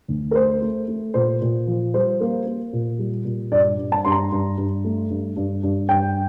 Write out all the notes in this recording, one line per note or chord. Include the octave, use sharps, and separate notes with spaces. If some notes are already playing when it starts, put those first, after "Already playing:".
D2
A#4
A3 C5
A3
A3
A#2 C5
A#2
F3
G3 C5
A#3
A#3
A#2
G3
A#2
G2 D5
G2
A5
G2 C6
A#5
G2
G2
A3
G2
G2
G2
G2 G5